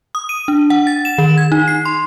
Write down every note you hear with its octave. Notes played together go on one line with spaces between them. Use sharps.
D#6
D#7
D4
F#5
A6
E7
D#3
G#6
D#4
C7
C6